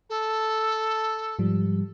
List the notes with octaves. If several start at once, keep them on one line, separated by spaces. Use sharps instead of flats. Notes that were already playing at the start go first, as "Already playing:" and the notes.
A4
G#2 F3 G3